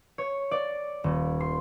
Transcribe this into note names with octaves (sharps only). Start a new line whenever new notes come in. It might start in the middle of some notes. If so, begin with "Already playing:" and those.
C#5
D5
D#1
C6